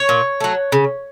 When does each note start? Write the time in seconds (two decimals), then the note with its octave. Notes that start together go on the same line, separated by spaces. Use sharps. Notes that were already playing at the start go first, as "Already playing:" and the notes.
Already playing: C#5
0.09 A#2
0.40 F#3 A3
0.72 C#3